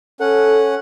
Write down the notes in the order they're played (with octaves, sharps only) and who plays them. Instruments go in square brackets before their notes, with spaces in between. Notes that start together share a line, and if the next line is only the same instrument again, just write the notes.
[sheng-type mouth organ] C#4 F#5 [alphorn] A4